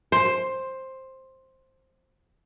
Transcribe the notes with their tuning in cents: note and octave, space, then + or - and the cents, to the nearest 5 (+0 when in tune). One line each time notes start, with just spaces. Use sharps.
C5 +10